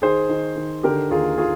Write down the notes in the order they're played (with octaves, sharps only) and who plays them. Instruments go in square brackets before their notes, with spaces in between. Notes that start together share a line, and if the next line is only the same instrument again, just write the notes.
[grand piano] D#3 G#4 C5
D#3
D#3
D3 G4 A#4
D#2 F4 G#4
F4 G#4